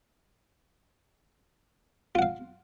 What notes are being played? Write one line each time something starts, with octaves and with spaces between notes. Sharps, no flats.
F4 F5 F#5